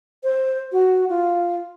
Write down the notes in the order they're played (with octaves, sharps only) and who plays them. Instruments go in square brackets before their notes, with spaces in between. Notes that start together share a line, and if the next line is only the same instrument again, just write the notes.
[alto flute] C5
F#4
F4